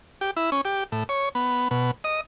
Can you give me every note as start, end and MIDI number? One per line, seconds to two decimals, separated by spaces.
0.21 0.31 67
0.37 0.50 64
0.52 0.61 61
0.65 0.84 67
0.92 1.03 45
1.09 1.29 73
1.35 1.68 59
1.71 1.91 47
2.04 2.21 75